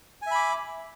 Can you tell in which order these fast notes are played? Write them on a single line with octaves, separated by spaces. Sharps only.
G#5 E5 B5 D6